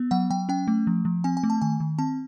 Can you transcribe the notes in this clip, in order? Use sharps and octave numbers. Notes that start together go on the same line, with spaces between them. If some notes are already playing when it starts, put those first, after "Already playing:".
Already playing: B3
F#3 F#5
F#3 G5
C#4 G5
A3
F3
F3
C4 G#5
G#5
A3
A5
D#3 G#5
D#3
C4 A5